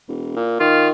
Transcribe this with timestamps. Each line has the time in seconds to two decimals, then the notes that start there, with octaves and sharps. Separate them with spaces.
0.08 E1
0.36 A#2
0.60 D#3 F4